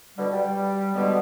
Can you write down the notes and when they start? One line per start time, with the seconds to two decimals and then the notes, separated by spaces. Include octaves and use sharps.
0.17 B2 D3 G3
0.32 G3
0.95 B2 D3 G3 G#3 B3